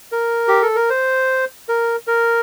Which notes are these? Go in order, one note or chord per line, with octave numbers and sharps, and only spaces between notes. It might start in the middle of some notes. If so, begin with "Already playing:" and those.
A#4
G4
A4
A#4
C5
A#4
A#4